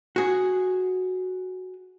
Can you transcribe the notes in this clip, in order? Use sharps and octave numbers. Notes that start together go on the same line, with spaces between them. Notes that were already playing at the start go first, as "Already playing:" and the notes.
F#4 G#4